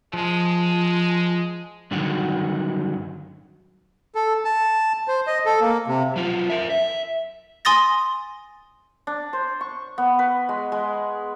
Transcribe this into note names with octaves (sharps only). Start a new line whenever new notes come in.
F3 G#3
G2 D3 D#3 F#3 F#4
A4
A5
C5
D#5
A4
A#3
C3
F#3 F4
A#4 E5
E5
G#5 C6 D#6 A6 A#6
D4
C5
C#6
B3
B4
G#3
G#3